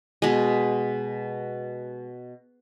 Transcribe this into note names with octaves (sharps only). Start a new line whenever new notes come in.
B2 G#3